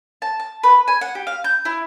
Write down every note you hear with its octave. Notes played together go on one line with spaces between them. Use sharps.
A5
A5
B4
G#5
F#5
G4
F5
G6
E4